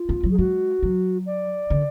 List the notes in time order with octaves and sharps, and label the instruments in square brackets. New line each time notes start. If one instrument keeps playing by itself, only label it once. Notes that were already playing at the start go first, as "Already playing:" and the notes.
Already playing: [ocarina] F4
[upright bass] B3
F#3
[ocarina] G#4
[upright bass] G#3 [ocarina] F#4
[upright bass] F#3
[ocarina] D5
[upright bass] D3